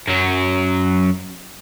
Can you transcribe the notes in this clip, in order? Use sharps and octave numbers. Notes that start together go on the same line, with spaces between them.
F#2 F#3